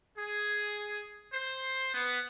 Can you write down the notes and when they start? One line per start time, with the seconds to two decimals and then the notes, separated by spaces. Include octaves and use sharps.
0.18 G#4
1.33 C5
1.94 B3